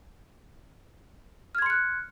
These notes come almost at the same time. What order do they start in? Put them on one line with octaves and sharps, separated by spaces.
F6 G#6 C6 C#7 F#6